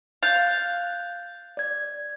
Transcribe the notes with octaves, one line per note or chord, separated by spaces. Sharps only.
F5 F#6 G6 A6
D5 G#6